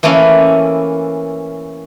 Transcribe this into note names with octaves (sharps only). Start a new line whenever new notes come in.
E3 A3 A#3 C#4 E4